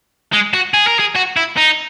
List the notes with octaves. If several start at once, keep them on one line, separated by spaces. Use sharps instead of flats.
G#3
F#4
G#4
A#4
G#4
F#4
E4
D#4